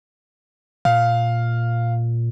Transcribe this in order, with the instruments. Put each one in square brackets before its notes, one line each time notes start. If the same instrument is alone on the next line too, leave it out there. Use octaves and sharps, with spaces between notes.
[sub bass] A#2 [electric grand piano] F5